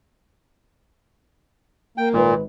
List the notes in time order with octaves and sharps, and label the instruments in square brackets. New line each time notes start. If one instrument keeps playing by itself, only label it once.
[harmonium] A#3 [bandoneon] G5
[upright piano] G#1 B4 [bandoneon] A#2